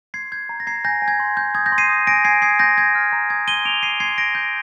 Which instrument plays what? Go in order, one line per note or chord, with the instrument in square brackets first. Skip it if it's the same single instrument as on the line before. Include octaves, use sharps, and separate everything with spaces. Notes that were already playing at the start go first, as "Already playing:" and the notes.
[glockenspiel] C6 G#6 C7
G6 G#6
A#5
A#6
A#5 G#6 C7
G#5 G6 A#6
G#5
G#6
C6
G6
D#6 G#6
G6 A#6
C6
C7 D#7
D#6
G#5 A#6 D7
G#5 G#6 C7
D#6 G#6 C7
C6 G6 A#6
G6 G#6
F6
A#5
D#6 G#6
C6 D#7 G7
D6 D7 F7
G6 C7 D#7
C6 G#6 C7
G6 A#6 D7
G6 A#6